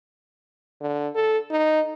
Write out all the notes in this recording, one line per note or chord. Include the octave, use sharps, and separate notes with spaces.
D3
A4
D#4